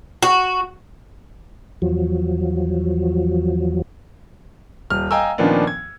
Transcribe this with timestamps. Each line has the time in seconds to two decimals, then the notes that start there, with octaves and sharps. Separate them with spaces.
0.23 F#4
1.82 E2 F3 F#3
4.90 D#1 F6
5.11 D#5 F5 G5 G#5 A#5 E6
5.38 A#2 D#3 F3 B3 C#4 D4
5.67 G#6